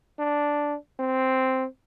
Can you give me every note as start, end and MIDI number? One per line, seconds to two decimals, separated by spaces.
0.19 0.76 62
1.00 1.66 60